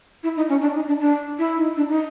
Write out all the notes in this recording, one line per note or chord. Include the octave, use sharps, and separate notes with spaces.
E4
D#4
C#4
D4
D#4
D4
D4
E4
D#4
D4
D#4